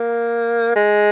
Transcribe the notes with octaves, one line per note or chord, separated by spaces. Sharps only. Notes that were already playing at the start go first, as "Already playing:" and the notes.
Already playing: A#3
G#3